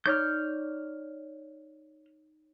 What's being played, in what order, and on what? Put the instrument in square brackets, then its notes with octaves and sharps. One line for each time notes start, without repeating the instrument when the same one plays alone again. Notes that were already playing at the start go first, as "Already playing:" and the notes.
[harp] D#4 C#5 D5 [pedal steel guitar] F6 G6